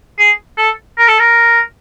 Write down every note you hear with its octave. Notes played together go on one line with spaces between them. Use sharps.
G#4
A4
A#4
A4
A#4